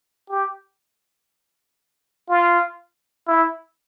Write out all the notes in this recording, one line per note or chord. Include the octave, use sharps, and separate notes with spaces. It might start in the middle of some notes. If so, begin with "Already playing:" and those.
G4
F4
E4